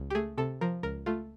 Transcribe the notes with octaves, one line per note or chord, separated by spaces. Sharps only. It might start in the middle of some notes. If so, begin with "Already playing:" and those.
Already playing: C#2
G4
A3 G#4
C3 A4
F3 A#4
C#2 A#4
A3 F4